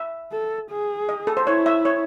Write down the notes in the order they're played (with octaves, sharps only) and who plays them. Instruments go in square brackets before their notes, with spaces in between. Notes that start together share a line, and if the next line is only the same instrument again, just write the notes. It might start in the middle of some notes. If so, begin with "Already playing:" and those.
Already playing: [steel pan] E5
[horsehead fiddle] A4
G#4
[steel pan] D#5
A4
C5
[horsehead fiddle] E4 [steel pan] C#5
[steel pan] E5
C#5